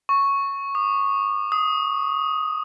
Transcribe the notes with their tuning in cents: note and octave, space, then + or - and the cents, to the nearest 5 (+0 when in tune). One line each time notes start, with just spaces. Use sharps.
C#6 +0
D#6 -45
D#6 +10